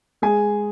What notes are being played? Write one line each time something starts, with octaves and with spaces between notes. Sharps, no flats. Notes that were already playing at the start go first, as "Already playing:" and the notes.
G#3 G#4 G#5